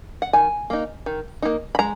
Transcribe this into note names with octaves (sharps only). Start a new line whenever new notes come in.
F#5
D#3 G#5
A#3 D#4
D#3
A#3 D#4
B5
G#3 A#5